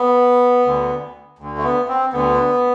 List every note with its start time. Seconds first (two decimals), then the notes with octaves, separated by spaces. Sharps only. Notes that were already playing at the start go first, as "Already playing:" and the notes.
Already playing: B3
0.65 D2 D3
1.39 D2 D3
1.58 A3
1.64 B3
1.88 C4
2.13 D2 D3 B3